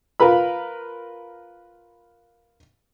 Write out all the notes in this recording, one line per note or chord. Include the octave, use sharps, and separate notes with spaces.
F4 A#4 B4 B5